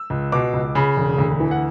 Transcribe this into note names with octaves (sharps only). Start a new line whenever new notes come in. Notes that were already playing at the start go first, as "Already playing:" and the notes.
Already playing: E6
C#2
B2 D6
C#2
C#3 B5
E1
D2
E3
F#5